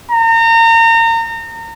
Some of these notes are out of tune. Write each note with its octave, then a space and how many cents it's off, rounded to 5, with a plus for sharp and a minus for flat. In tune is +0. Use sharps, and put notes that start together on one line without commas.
A#5 -35